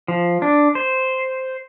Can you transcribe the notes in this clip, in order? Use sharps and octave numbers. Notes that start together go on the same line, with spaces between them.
F3
D4
C5